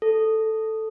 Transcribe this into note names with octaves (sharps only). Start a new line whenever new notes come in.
A4